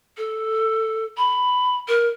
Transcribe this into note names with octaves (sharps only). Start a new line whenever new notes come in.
A4
B5
A#4